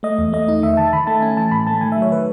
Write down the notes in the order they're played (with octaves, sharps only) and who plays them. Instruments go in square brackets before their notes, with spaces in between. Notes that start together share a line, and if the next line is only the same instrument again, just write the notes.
[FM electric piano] A3 D#5
E2
A3 D#5
D#4
D#3 E5
D#3 A5
D#3 B5
A3 A5
C#4 G#5
E3 A5
A2 B5
A3 A5
D#3 G#5
E5
F#3 C#5
D#3 B4